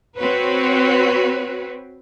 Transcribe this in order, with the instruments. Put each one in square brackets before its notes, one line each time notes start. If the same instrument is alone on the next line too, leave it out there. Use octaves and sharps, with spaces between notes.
[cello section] C4 F#4 B4 C#5